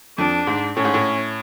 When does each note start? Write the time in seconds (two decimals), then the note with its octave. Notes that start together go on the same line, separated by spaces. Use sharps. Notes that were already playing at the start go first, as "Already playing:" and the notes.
0.18 F2 D4
0.47 G#2
0.76 A2 C#4
0.85 G#2
0.94 A2